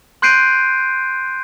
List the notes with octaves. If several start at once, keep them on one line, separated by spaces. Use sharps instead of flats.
C6 F#6 G6 C7 D7 D#7